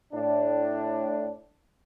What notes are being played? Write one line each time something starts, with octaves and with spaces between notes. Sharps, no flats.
A2 D4